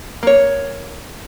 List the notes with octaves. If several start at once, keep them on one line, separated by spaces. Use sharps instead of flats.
A#3 C#5